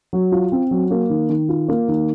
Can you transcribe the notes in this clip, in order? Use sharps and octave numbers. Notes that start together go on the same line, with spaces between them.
F#3
F4
C4
F#3
A#3
D#3
D#3
F4
A#3
D#3